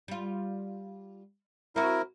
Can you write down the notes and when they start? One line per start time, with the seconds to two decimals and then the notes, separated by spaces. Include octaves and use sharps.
0.08 G3 F4
1.76 C4 E4 F#4 A#4